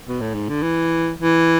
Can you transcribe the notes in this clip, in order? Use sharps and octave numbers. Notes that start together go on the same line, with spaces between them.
B2
A2
G#2
D3
E3
E3